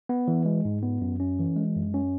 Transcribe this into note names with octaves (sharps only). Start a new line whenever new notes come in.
B3
E3
G#3
G#2
B3
F#2
C#4
E3
G#3
F#2
C#4